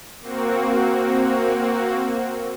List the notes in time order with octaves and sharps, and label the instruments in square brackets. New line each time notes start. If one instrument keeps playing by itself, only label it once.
[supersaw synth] A#3 C4 F#4